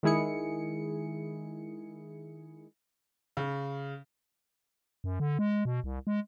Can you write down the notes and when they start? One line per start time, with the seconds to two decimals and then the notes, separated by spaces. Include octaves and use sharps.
0.03 D#3 G#3 E4 G#4 C#7
3.37 C#3
5.04 F#2
5.20 D3
5.39 G#3
5.65 B2
5.84 C2
6.07 G#3